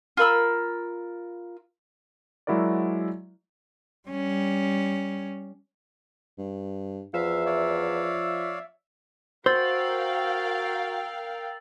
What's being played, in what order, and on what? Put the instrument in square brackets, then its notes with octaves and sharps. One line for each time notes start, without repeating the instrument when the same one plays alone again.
[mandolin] F4 A#4 B5 E6
[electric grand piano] F#3 G#3 E4 F#4 A#4 D5
[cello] G3 C#4
[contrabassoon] G2
[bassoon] E2 [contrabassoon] F3 [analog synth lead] E5 [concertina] F5
[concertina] C#5 D5 F5
[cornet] F#4 [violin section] A#4 F5 G5 [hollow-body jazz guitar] C5 [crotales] E6 A6